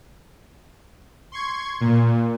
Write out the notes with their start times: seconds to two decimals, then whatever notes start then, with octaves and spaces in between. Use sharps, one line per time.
1.32 C6 C#6 G#6
1.81 A#2